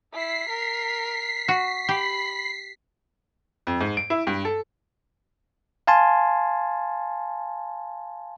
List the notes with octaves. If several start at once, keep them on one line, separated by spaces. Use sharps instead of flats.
E4 B6 C7
A#4
F#4
G4 B5
F2
G#2
D7
E4
G2
A4
F5 G#5 A5 C6